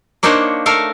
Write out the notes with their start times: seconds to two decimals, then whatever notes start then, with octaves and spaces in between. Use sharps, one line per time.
0.23 A#3 D4 D#4 C5 C#5 F#5
0.66 A3 A4 A#4 F5